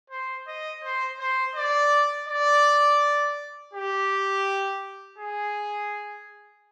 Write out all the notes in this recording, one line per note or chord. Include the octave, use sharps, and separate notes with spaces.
C5
D#5
C5
C5
D5
D5
G4
G#4